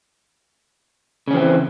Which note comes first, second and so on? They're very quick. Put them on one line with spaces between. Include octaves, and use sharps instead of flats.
C#3 C#4 F3 C4 E3